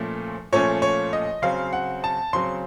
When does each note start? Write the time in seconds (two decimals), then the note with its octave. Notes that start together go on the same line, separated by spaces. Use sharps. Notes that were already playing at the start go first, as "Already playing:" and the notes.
Already playing: A#2 F3 A3 C#4
0.52 A#2 F3 A3 C#4 C#5
0.82 C#5
1.13 D#5
1.42 C#3 F#3 C4 F5
1.73 F#5
2.04 A5
2.33 C#3 F#3 C4 C6